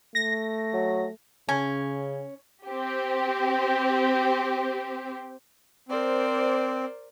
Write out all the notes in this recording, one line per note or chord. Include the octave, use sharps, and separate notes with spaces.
A3 A#6
F#3
C#3 C#4 G#5
C4 G4
C4 A#4 C5 D5